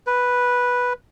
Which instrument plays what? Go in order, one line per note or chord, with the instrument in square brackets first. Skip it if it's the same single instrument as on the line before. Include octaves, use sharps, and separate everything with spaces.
[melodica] B4